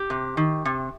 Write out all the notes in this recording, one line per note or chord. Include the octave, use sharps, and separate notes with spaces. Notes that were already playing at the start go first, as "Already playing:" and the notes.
Already playing: G4
C3
D#3
C3